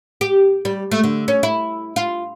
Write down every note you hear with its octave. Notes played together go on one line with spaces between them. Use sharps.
G4
G3
A3
D3
C#4
E4
F4